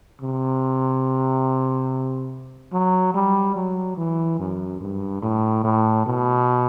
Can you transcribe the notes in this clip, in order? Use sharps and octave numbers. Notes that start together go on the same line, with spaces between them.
C3
F#3
G3
F#3
E3
F#2
G2
A2
A2
B2